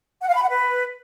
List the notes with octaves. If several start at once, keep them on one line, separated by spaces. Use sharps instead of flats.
F#5
F5
B5
F#5
B4